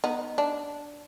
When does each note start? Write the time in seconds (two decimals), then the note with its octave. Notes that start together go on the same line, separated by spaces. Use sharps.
0.04 B3 D#4
0.38 D4